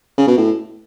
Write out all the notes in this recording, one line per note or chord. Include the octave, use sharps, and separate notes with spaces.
C#3
B2
A2